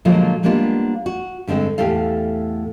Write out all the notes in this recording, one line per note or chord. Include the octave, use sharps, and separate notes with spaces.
A#2 D3 F3 F#3 G#3
G3 G#3 A#3 B3 D4 F4
F#4
G2 D3 G#3 C4
E2 A2 D#3 G4 A4 F5